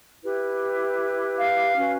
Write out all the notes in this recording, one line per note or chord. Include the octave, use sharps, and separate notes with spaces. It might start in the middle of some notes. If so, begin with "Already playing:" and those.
E4 G4 B4
F5
C#4 F#4 B4